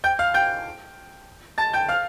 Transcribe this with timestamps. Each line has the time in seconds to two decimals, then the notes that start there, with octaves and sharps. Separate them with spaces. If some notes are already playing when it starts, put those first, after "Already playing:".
0.04 G5 G6
0.19 F5 F6
0.34 G5 G6
1.58 A5 A6
1.73 G5 G6
1.88 F5 F6